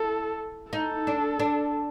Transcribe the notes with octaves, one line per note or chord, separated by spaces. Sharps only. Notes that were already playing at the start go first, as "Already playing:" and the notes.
Already playing: E4 A4
D#4 A4
D4
D4